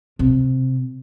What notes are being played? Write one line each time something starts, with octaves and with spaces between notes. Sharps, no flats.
C3